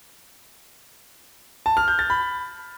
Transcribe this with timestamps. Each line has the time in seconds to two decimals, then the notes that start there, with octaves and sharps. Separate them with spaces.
1.66 A5
1.77 F6
1.88 G6
1.99 A6
2.10 B5